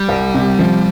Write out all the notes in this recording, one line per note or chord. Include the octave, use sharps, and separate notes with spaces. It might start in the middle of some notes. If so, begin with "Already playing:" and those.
Already playing: G3
C2
C3
F3